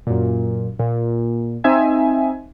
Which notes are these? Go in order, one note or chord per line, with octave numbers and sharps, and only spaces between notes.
F#2 A#2
A#2
C4 D#4 E5 G#5